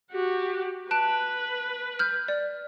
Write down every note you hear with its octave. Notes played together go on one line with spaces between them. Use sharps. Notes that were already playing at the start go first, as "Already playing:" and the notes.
F#4 G4
B4 A5 F#6 D7
F6 G6
D5